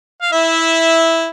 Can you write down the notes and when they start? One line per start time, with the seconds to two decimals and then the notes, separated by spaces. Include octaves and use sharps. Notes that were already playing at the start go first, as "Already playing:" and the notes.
0.22 F5
0.32 E4 E5